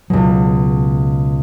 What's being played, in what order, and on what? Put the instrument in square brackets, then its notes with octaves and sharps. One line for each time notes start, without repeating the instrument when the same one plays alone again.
[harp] C#2 B2 [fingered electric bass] F#3